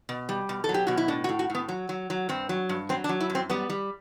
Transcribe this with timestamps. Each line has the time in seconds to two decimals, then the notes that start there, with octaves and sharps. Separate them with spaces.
0.09 B2
0.29 G3
0.49 B2
0.64 A4
0.69 F#3
0.74 G4
0.87 B2 F#4
0.97 E4
1.08 A2 D4
1.24 F#4
1.29 A2
1.39 F#4
1.50 A2
1.55 B3
1.68 F#3
1.89 F#3
2.10 F#3
2.29 G2 C4
2.49 F#3
2.69 G2
2.89 F#3 C4
3.04 D4
3.09 F#3
3.20 E4
3.30 F#2
3.35 C4
3.50 G3 B3
3.70 G3